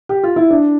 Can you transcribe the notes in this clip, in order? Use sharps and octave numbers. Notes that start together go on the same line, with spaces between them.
G4
F4
E4
D4